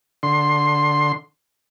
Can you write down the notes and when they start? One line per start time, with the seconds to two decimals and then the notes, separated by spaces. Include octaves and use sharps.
0.23 D3 C6